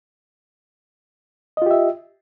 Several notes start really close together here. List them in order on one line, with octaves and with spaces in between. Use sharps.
D#5 F4 G4 E5